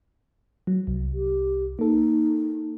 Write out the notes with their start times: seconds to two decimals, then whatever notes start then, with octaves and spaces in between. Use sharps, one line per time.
0.67 F#3
0.87 C2
1.13 G4
1.79 A#3 D#4 A4